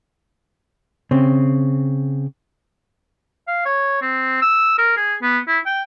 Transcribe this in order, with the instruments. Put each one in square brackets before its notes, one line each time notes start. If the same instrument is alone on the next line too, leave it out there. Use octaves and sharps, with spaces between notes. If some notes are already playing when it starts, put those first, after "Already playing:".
[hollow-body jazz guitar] C#3 C4
[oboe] F5
C#5
C4
E6
A#4
G#4
B3
E4
G5